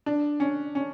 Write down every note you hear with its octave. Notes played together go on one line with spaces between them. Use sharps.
D4
C#4
C#4